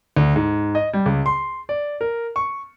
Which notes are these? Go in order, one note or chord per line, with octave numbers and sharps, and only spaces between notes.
D2
G#2
D#5
G3
C#2
C6
D5
A#4
C#6